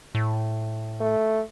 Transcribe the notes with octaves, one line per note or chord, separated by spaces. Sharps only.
A2
A3